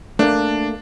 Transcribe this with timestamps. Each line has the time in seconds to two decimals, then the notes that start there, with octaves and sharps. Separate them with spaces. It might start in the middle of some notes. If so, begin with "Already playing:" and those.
0.19 A3 A#3 D4